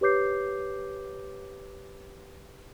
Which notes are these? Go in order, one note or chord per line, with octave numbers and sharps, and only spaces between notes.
G4 B4 C#5 D6 G6 C7